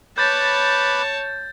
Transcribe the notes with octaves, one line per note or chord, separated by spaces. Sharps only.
B4 C#5 A5 B5 D6 G6 A6